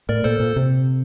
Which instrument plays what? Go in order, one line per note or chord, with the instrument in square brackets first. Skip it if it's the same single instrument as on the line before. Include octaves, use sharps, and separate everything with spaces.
[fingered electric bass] A2 [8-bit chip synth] A#4 D5
[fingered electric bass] A#2 [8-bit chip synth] A4 C5
[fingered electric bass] A#2
C3